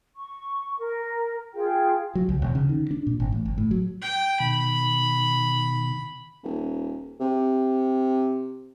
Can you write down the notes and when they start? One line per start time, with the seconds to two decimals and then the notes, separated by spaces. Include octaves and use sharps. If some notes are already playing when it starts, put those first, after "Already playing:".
0.16 C#6
0.79 A#4
1.54 F4 G#4 G5
2.15 F#3
2.29 C#2
2.42 E1
2.55 C#3
2.69 D#3
2.91 D4
3.07 A#2
3.20 G#1
3.32 A1
3.45 G1
3.58 A2
3.71 F#3
4.02 G5 G6
4.40 B2 D#3 B5
6.44 D#1
7.20 C3